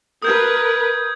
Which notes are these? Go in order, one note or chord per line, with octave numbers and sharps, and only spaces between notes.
A#4 B4 D#6 G6 G#6